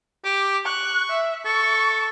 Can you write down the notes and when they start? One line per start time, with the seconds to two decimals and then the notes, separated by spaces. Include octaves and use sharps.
0.24 G4 D6
0.65 C#6 F#6
1.10 E5
1.45 A4 C#6